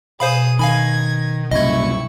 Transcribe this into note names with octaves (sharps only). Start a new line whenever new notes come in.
B2 G#4 C5 F5 B5 D#6
D#3 F5 G#5 B5 G#6 A#6
C2 F#2 A#2 E4 D#5 C#6 G#6